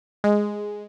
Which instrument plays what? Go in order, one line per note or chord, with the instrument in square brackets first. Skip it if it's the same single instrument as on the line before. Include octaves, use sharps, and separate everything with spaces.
[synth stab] G#3